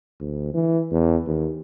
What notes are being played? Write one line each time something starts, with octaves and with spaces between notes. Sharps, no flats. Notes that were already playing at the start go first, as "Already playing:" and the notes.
D2
E3
E2
D#2